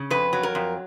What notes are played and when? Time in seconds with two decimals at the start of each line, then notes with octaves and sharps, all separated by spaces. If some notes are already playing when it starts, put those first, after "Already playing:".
Already playing: C#3
0.10 F2 B4
0.33 F#3
0.43 A#4
0.55 F2